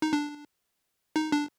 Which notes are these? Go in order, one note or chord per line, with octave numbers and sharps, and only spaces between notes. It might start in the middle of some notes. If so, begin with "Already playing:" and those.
D#4
D4
D#4
D4